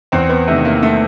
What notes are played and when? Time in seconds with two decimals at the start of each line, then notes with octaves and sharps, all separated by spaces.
0.12 E2 C4
0.29 B3
0.48 C3 D#3 A3
0.65 A#3
0.83 A3